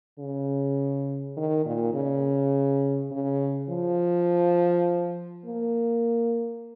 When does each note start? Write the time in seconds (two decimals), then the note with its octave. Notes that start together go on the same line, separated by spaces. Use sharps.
0.19 C#3
1.37 D#3
1.66 A#2
1.94 C#3
3.11 C#3
3.69 F3
5.46 A#3